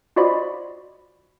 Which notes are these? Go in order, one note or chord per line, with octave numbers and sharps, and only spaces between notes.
F4 F#4 C5 D5 D#5 B5